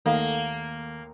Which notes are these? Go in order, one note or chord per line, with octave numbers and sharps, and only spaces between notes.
D#2 D#3 A3 A#3 A4 A#4 F5 F#5